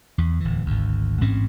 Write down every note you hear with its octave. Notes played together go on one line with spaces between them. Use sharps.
E2
D1 E3
G#1 D2
A1 G#2 C4 C#4